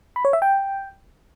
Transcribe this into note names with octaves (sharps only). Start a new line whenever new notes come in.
B5
C#5
E5
G5